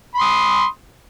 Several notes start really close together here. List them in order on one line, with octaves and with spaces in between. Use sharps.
B5 C6 D#6